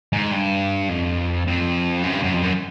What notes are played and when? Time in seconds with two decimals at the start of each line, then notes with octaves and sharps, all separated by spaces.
0.13 G#2
0.31 G2
0.89 F2
1.47 F2
2.03 F#2
2.13 G2
2.23 F#2
2.34 F2
2.43 F#2